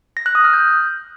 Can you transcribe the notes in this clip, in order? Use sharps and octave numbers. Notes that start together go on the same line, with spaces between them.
A#6
F#6
D#6
F6
G6